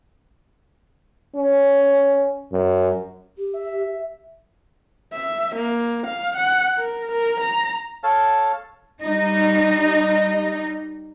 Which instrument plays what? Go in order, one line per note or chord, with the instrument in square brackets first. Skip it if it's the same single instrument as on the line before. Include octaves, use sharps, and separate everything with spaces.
[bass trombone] C#4
F#2
[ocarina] G4
[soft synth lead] E5
[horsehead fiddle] E5
A#3
F5
F#5
A#4
A#4
A#5
[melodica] A4 C#5 F5 A5
[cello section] G3 D#4